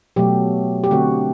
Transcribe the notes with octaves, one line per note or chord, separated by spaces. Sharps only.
B2 F#3 A3 G4
G4
D3 A3 C4 F#4